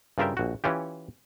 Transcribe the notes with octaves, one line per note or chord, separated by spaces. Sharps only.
G2 C#3 F4 A#4 E5 G5
A#1 F#4
E3 C#4 F4 G4